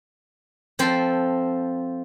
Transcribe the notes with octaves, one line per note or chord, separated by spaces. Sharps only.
F3 C4 A4 C5